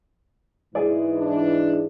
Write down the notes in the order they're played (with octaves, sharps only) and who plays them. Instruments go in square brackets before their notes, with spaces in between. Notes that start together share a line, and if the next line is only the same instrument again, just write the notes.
[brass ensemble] G#2 E3 G#3 [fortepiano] G#4 D5
[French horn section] D4